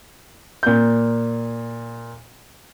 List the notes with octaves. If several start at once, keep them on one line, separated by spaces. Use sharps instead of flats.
A#2 G6